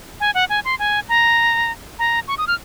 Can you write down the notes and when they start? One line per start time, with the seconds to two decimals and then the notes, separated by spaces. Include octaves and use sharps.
0.20 G#5
0.34 F#5
0.49 G#5
0.65 C6
0.79 G#5
1.09 A#5
1.99 A#5
2.28 C#6
2.38 D#6
2.48 F6